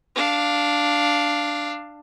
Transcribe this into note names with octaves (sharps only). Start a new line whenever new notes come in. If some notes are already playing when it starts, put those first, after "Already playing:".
D4 F5